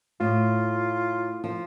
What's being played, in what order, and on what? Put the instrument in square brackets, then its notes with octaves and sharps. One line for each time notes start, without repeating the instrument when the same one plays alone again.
[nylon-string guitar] A2 [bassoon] F4
[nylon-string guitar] F3